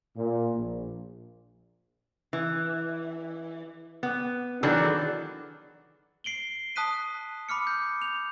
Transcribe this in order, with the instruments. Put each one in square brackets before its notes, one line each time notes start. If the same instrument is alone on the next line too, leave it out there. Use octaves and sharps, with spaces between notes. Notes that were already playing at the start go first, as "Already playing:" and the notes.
[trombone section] A#2
A#1
[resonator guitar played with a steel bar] E3
B3
D#3 E3 F#3 D4 G#4 A4
[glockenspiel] C7 D7 F#7 G7
A5 D#6 F#6 B6 D#7
B5 D6 F6 C#7
G6
F7